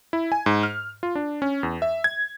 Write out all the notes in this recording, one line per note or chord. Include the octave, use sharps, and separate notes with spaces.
E4
G#5
G#2
F6
F4
D4
C#4
E2
E5
G#6